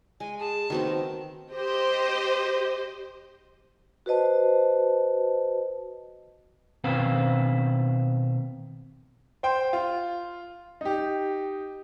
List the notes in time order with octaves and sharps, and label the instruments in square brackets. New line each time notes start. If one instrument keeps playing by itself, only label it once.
[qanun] G#3 [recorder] G#5
[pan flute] G#4 [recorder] A5
[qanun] D#3 B3 C4 [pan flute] F#4
[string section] G4 C5 D#5
[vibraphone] F#4 B4 C5 D#5 A5
[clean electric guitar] B2 D#3 C4 B4 C5 F5
[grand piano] C5 G5 C6
F4
D#4 G4